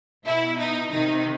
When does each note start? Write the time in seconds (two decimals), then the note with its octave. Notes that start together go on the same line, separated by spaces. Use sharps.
0.25 B2 E4
0.58 D#4
0.91 C3 D#3 D#4